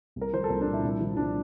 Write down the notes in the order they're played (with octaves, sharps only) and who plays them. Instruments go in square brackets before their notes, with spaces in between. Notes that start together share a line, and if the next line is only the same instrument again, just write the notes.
[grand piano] C2
A#4
F3 C5
A4
C2 A#4
D4
A#2
E4
C2
F3
C2 D4